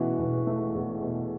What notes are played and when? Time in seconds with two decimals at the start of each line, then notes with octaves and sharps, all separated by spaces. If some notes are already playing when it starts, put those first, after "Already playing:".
Already playing: E1 E2 B2 E3 A3 C#4 E4 F#4
0.18 E1
0.47 A3
0.75 E2
1.02 B2